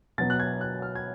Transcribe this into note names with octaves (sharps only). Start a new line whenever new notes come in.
B2 F#3 B3 A6
F#6
G#6
F#6
F6
G#6